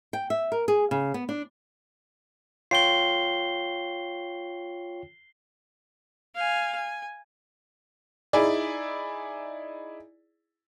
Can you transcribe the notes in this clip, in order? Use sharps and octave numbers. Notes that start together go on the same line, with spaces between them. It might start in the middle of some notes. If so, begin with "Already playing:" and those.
G5
E5
A#4
G#4
C#3
B3
D4
F4 C#5 G5 C7 G7
F5 G#5
G#5
D#4 E4 G#4 D5